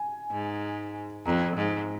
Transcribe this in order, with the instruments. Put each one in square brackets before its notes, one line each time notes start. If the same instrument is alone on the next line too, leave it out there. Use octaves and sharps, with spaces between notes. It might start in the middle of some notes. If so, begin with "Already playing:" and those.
Already playing: [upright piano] G#5
[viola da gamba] G#2
[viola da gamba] F2 [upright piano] A#5
[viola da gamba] G#2